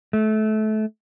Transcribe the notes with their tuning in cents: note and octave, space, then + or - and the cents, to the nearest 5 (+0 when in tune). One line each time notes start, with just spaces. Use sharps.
A3 -25